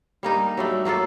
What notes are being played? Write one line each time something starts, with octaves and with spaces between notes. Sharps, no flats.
G3 A#3 D#4
F#3 G3 A3
F#3 A#3 F4 A4